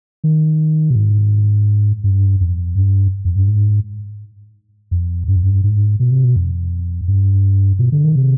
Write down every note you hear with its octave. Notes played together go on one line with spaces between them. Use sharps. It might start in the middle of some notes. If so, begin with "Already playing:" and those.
D#3
B2
G#2
G2
F2
G2
F2
G2
G#2
F2
G2
F2
G2
G#2
B2
C3
B2
F2
G2
B2
D3
D#3
C3